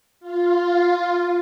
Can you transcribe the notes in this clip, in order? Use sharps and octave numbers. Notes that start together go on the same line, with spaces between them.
F4